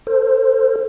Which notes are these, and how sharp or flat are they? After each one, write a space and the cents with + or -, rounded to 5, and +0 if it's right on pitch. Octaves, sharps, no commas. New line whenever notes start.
A4 +35 C5 +0